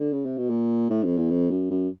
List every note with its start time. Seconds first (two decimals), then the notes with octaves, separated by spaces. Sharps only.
0.00 D3
0.13 C#3
0.26 C3
0.38 B2
0.50 A#2
0.90 A2
1.04 F2
1.18 E2
1.30 F2
1.51 F#2
1.71 F#2